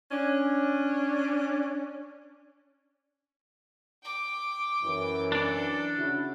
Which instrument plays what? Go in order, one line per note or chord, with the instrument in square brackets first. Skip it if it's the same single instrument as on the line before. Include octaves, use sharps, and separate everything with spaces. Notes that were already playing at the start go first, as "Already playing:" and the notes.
[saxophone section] C#4 D4
[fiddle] G5 D6
[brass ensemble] F#2 E3
[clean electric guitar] D4 D5 [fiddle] A4
[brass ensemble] C#3 E4 F#4